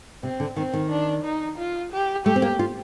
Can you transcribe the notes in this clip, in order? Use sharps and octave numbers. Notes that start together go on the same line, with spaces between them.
C3 C4
D3
D#3 C4
D#3
D4
D#4
F4
G4
A3 G4
C4
A#3
F4